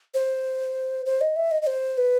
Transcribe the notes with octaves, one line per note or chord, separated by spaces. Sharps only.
C5
C5
D#5
E5
D#5
D#5
C5
B4